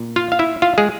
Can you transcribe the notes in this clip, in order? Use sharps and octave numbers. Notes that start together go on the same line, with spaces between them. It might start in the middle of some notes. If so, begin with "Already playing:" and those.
Already playing: A#2
F4 F5
F5
E4 E5
F4 F5
G#3 G#4